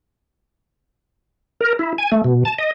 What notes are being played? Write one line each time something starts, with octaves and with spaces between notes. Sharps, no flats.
A#4
E4
G#5
A3
B2
A5
D#5